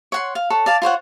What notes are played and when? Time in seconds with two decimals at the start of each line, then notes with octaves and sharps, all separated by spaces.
0.12 C#5 F#5 C6
0.35 F5
0.50 A4 C#5 F#5
0.66 D5 F5 A5
0.82 F4 C5 C#5 F#5